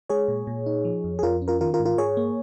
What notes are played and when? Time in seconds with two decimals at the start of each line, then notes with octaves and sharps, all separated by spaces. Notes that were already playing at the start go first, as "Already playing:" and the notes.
0.09 G#3 G#4 C#5
0.28 A#2
0.47 A#2
0.66 D#4
0.85 F3
1.04 F2
1.19 G#4
1.23 F2 F4 A#4
1.42 C#4
1.48 F4 A#4
1.61 D#3 F4 A#4
1.74 F4 A#4
1.79 G#2
1.85 F4 A#4
1.98 G#2 G#4 C#5
2.17 A#3